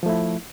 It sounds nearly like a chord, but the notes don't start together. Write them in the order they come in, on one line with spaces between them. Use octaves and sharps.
F3 A3 E4